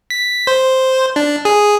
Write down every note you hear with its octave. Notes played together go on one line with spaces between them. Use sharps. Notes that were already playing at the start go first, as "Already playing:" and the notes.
B6
C5
D4
G#4